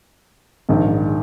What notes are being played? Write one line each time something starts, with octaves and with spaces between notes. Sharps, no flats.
A#1 G#2 D#3